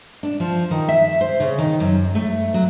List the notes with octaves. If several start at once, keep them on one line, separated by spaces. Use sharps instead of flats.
D4
F3
D#3
E5
C5
C#3
D#3
F#2
A3
F#3